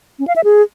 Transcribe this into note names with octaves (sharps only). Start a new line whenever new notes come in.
C#4
F5
E5
G#4